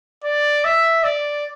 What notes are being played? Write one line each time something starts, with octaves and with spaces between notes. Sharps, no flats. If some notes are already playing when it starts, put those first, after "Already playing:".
D5
E5
D5